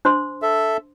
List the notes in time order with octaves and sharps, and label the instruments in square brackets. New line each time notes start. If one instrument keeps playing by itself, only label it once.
[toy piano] D4 C5 C6
[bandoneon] A4 E5